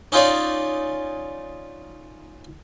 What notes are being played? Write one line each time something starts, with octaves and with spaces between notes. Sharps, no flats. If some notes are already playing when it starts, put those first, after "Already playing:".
C#4 D#4 F4 C#5 D5